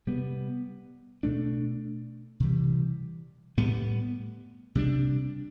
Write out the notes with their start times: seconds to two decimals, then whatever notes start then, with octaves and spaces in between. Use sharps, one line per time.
0.07 C3 G3 B3
1.23 B2 A3 D4
2.40 C3 E3 G3
3.57 A2 G3 B3
4.75 C3 G3 D4